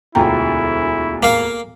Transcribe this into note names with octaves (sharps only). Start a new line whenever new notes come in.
E1 D2 E4 F4 G5 A#5
A#3 F5